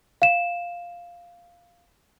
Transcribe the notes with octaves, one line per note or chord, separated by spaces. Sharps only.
F5 E7